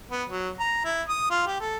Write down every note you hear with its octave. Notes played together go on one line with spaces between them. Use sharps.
B3
F#3
A#5
E4
D#6
F4
G4
A4